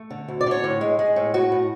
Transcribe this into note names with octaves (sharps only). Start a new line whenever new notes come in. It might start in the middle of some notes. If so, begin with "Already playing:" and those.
Already playing: A3
D3
D2
D5
D3 C#5
A2
G#3
G#3
A2
A2 F#4
A2